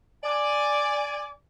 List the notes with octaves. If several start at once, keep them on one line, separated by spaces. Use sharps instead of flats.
D5 G#5